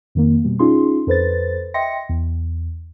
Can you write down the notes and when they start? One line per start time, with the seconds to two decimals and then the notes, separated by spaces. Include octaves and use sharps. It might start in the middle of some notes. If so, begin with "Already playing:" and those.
0.15 F2 D#3 A#3
0.44 B2 G3
0.59 C#4 D#4 F4 G#4 C6
1.07 F2 A4 B4 C5 A6
1.74 D#5 E5 G5 C6 A#6 C#7
2.09 E2